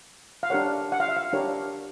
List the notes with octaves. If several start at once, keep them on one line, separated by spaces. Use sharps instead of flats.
F5
D4 G4 A#4 C#5 F#5
F#5
F5
E5
F5
D4 G4 A#4 C#5